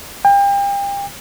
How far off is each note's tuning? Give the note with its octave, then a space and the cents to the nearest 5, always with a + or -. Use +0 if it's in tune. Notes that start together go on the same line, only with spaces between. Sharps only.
G5 +35